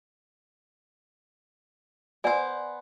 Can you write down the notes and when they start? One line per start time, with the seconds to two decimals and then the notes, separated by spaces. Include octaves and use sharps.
2.24 B3 C5 D5 G#5